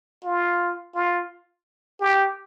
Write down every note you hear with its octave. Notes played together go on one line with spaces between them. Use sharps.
F4
F4
G4